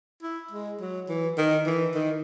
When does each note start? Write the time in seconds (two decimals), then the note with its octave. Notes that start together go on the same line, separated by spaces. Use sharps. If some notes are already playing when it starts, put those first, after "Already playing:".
0.23 E4
0.51 G#3
0.81 F#3
1.09 E3
1.38 D#3
1.66 E3
1.95 D#3